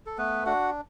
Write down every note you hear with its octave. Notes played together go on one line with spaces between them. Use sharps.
A4
A3 B3 B4
D4 F#4 F#5